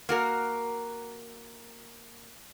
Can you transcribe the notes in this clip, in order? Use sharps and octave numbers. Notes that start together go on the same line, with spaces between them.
A#3 F#4 A#4